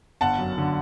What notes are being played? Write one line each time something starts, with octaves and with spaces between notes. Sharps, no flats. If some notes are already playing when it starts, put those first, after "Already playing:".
G1 F#5 A5
F#2
D3